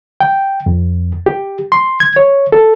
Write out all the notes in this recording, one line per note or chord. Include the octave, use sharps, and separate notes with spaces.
G5
F2
G4
C6
G#6
C#5
A4